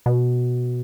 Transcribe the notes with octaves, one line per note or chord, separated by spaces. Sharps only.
B2